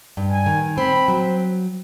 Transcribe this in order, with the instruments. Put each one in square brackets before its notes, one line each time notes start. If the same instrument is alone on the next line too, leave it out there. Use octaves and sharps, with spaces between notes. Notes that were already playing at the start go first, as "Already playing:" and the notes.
[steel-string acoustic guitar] G2
[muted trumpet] G#5
[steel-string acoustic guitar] D#3
[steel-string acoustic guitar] C4 [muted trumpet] B5
[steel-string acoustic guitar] F#3